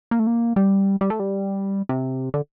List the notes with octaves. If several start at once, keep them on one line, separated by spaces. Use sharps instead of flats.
A#3
A3
A#3
G3
G3
A3
G3
C3
D3